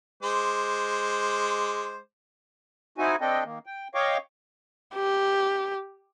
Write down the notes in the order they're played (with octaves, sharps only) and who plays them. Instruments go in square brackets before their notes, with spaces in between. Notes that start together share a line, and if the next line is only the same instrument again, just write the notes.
[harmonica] G#3 C5 D6
[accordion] C4 D#4 E4 F#4 G#5
C4 D4 A4 D#5 G5
D#3 A#3
G5
C#5 D#5 F5 G5 C#6 D6
[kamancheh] G4